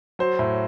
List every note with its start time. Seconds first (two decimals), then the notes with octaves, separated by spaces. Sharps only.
0.19 F#3 C5
0.39 A2